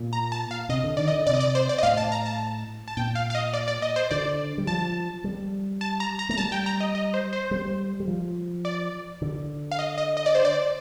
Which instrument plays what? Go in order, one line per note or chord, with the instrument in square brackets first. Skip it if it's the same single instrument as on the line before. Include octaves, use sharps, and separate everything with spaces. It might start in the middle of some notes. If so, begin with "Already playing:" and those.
Already playing: [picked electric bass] A#2
[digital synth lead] A#5
A5
F5
[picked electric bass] C3 [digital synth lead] D#5
[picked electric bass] D3
[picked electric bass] D#3 [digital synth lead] D5
[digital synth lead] D#5
[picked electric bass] D3
[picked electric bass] C3 [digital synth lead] D5
[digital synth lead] D#5
D5
C5
D5
D#5
[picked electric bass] A2 [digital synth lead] F5
[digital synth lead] A5
A#5
A5
A5
[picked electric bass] A#2 [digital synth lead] G5
[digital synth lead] F5
F5
D#5
D5
D5
D#5
C5
[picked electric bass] D3 [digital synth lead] D5
[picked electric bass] G3
[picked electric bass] F3 [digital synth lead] A5
[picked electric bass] G3
[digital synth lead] A5
A#5
A#5
[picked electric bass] A3 [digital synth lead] A#5
[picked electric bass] G3 [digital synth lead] A5
[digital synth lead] G5
A#5
D#5
D#5
C5
C5
[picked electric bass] G3
G3
F3
[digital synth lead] D5
[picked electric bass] D3
[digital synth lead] F5
D#5
D#5
D#5
D5
C5
D5